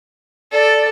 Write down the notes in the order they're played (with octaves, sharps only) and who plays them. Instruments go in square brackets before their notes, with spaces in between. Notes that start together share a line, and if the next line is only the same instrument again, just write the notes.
[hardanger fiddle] A4 [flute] D5